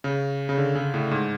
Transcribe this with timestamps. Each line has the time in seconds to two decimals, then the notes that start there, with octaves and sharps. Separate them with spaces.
0.04 C#3
0.49 C#3
0.58 D3
0.75 C#3
0.94 A2
1.11 G#2